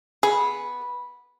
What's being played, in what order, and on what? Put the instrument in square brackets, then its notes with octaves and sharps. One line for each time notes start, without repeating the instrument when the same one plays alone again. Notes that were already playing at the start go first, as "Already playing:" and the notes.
[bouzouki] B3 [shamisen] G#4